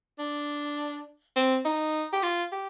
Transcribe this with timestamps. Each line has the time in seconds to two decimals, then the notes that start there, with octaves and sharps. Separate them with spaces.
0.19 D4
1.36 C4
1.65 D#4
2.13 G4
2.23 F4
2.52 G4